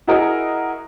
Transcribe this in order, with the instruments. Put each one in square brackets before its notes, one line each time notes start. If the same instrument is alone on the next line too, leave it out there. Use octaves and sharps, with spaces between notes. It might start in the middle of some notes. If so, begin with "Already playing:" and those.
[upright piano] E4 F#4 G#4 A#4 D#5